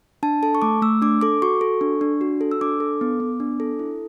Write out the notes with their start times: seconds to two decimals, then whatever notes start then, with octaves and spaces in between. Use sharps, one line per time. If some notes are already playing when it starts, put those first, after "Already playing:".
0.23 D4 A5
0.43 A4 A5
0.55 C#6
0.62 A3 D6
0.82 A3 E6
1.02 D4 D6
1.21 A4 D6
1.42 F#4 C#6
1.61 A4
1.81 D4
2.01 D4
2.21 F#4
2.41 A4
2.51 E6
2.61 D4 D6
2.80 A4
3.01 B3
3.20 B3
3.40 D4
3.60 A4
3.79 E4